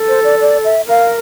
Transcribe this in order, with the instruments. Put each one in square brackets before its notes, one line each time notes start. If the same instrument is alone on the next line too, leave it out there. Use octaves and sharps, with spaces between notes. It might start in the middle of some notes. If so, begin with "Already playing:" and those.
Already playing: [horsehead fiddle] A4
[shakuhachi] C5
D5
D5
E5
[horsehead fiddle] A#4 [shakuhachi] F5